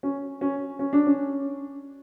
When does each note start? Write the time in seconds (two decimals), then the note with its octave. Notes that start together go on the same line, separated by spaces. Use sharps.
0.03 C#4
0.41 C#4
0.79 C#4
0.93 D4
1.07 C#4